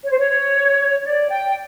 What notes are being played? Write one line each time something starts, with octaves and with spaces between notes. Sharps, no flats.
C#5
C5
C#5
D5
G5